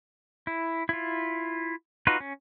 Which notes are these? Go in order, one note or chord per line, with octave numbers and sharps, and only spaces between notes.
E4
E4 F4
D#4 F4 F#4 B4
C#4